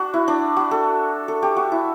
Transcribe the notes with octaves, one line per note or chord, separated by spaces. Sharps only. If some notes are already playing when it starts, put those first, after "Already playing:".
Already playing: D4 F#4
E4
D4
F#4
A4
A4
G4
F#4
E4